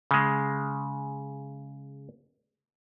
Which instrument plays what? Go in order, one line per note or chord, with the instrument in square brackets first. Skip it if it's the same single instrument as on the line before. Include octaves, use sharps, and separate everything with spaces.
[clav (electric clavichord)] C#3 G#3